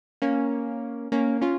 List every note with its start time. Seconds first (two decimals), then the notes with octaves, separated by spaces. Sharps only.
0.22 A#3 C#4
1.12 A#3 C#4
1.41 C#4 F4